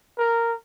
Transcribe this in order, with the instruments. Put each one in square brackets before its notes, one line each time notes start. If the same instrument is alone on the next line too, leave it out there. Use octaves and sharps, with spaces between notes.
[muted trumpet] A#4